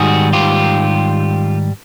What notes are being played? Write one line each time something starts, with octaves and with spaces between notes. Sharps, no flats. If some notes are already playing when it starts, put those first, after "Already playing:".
Already playing: G#2 D#3 G3 F#4 G#4
F4 G4